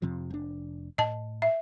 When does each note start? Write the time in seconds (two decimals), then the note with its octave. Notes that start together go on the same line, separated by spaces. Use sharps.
0.02 F2 C3 F3
0.30 F1 D4
0.98 A2 D#5 A5
1.42 E5